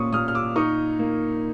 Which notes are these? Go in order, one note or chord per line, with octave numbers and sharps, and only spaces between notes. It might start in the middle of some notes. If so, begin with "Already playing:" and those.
Already playing: A#2 C#4 C#6 D#6
A#2 D#6 F6
F6
D6 E6
D#4 C#6 D#6
A#3